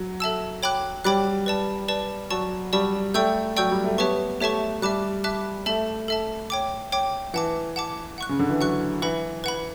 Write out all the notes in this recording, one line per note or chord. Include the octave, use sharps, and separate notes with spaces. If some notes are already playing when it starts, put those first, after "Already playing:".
Already playing: F#3
A4 E5 A5 E6
C#5 G5 B5 D6 F#6
G3 C#5 G5 B5 D6 F#6
B4 D5 A5
B4 D5 A5
F#3 D5 A5 C#6
G3 D5 A5 C#6
A3 D5 G5 C#6 E6 G6
F#3 D5 G5 C#6 E6 G6
G3
A3
B3 G4 C#5 E5 A5 C#6
A3 G4 C#5 E5 A5 C#6
G3 E5 A5 D6 F#6
E5 A5 D6 F#6
A3 A4 E5 A5
A4 E5 A5
C#5 G5 D6
C#5 G5 D6
E3 F#5 A5 D6
F#5 A5 D6
F#5 C#6 F#6
C#3
D3
E3
F#3 F#5 C#6 F#6
E3 B4 F#5 B5
B4 F#5 B5